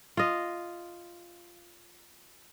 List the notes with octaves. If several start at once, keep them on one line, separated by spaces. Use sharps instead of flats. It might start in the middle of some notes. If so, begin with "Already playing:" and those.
F4 D#5